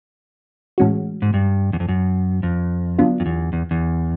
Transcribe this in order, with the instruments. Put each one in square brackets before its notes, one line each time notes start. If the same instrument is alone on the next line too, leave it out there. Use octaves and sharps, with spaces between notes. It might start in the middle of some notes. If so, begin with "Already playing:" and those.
[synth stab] A2 E3 G#3 C#4 F#4
[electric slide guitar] G#2
G2
E2
F2
F#2
F2
[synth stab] D3 F#3 B3 D4 F4
[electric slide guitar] F2
E2
E2
E2